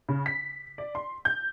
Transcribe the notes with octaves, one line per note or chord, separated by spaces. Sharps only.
C#3
B6
D5
C6
G6